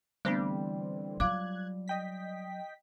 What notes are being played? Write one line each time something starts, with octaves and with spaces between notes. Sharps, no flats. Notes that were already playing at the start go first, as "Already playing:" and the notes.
D3 E3 G3 A3 B3 C4 D4
F#3 F4 F5 D6 F#6 G#6
D#5 G5 B6